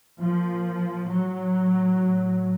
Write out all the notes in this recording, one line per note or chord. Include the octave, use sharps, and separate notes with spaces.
A#2 F3
A2 F#3
A2